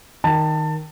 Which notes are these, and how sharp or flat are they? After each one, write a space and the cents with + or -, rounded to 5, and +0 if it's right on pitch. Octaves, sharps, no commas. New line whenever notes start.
D#3 +0 A5 +25